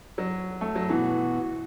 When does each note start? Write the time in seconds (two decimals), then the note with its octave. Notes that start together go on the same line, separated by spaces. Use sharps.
0.18 F#3
0.61 A3
0.76 F#3
0.89 B2 E3 B3 F#4